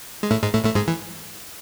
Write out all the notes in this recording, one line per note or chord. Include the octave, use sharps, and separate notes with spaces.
G#3
A2 A3
G#2 G#3
A2 A3
A2 A3
G#2 G#3
E3